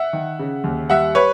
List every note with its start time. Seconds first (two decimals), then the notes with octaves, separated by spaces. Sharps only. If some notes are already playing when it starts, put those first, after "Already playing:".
Already playing: E5 F#5
0.13 D#3
0.39 C#3
0.64 D#2
0.90 G3 E5 F#5
1.15 B4 C#5